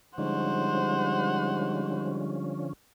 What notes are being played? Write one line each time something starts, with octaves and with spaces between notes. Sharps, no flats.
G#2 D3 F3 G3 C#4 C5 F#5